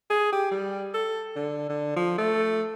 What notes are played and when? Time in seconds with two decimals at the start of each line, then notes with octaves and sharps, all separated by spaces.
0.10 G#4
0.33 G4
0.51 G3
0.94 A4
1.36 D3
1.69 D3
1.96 F3
2.18 A3